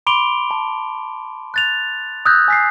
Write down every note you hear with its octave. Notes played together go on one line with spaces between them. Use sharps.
B5 C6 D6 D7 F7 G7
A5
F#6 A6 F7
D#6 E6 F#6 G6 A6 A#6
G#5 B6 C7